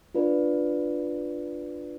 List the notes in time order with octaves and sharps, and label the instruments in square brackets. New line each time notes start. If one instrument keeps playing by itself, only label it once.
[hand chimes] D4 F4 B4 D5